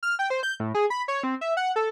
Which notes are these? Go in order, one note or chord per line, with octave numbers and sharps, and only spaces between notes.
F6
G5
C5
G6
A2
G#4
B5
C#5
C4
E5
F#5
A4